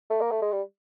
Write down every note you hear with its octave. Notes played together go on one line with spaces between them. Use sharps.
A3
A#3
A3
G#3
G3